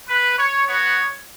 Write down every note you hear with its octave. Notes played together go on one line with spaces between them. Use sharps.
B4
C#5
B3 F#4 C#5